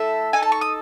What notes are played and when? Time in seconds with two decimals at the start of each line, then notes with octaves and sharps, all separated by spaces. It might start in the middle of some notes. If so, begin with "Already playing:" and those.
Already playing: A3 E4 A4 E5
0.33 D#4 A4 G#5
0.43 A5
0.52 C#6
0.61 D#6